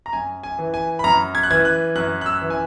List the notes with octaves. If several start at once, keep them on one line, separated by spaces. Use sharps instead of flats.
A#5
F#2 G#5
G#5
E3
G#5
B5
F#2 A#5
G#6
F#6
E3 G#6
F#6
F#2 F#6
F#6
E6
E3
G#5